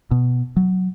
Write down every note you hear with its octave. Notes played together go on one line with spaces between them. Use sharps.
B2
F#3